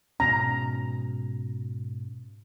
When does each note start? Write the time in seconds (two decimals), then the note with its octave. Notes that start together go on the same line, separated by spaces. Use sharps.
0.20 G#2 B2 C#4 A#5